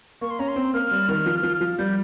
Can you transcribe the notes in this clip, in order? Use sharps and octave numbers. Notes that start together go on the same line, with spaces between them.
A#3 C#6
C6
C#4 A#5
C6
C4
A#3 F6
G3
D#3
F3
F3
F3
G3 G6